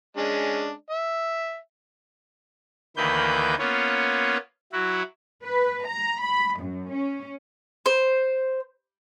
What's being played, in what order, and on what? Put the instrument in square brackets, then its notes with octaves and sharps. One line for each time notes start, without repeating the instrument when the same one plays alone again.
[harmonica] G#3 C#4 D4
E5
[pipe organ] D2 D#3 E3 A#3 B4 G6
A#3 B3 C#4 F4 C#5
F#3 E4 F#4
[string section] B4
A#5
B5
F#2
C#4
[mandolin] C5